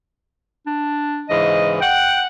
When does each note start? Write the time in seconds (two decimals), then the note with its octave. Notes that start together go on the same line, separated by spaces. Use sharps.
0.66 D4
1.29 G#2 C#3 E3 D#5
1.81 F#5 G5